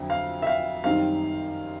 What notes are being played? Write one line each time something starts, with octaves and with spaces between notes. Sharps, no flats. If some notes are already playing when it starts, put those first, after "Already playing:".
Already playing: F2 D3 F#3 E4
F5
E5
F5
F#2 D#3 G3 C4 D#4 F5